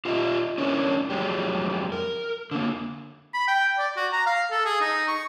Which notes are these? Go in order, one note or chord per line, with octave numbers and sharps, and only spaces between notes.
F4 G4 D#5 E5
C#4 D4 E4 A#4 C#5 D5
F2 F#3 G#3 G4
A#4
D3 A#3
B5
G5
D5
F#4
A#5
F5
A4
G#4
D#4
C#6